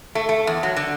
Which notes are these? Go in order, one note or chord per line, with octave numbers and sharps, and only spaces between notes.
A3
A3
E2
F#3
D3